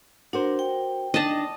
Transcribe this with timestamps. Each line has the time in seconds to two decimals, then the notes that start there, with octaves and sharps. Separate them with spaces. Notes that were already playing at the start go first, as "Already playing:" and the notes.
0.33 D4 F#4 A#4 C5
0.59 G5
1.14 D4 D#4 D#5 A5